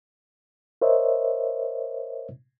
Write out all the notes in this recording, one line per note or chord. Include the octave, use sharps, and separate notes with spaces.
A#4 C5 C#5 D#5 E5